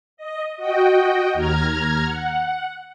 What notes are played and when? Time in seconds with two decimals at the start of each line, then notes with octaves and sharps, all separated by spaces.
0.17 D#5
0.57 F#4 D#5 G5
1.34 D#2 A#5 F6 G#6
2.05 F#5